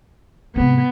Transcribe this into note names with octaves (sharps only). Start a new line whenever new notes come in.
G#2 C3 B3